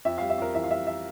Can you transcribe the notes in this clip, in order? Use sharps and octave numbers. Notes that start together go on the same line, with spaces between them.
F2 E5
G3 F5
E5
F2 A#4
E3 E5
F5
G3 E5
E5